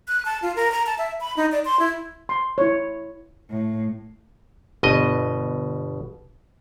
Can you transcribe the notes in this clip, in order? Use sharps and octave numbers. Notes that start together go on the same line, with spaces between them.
F#6
A5
F4
A#4
A#5
A5
E5
B5
D#4
D5
C6
E4
C6
E4 C#5
A2
G1 B2 D#5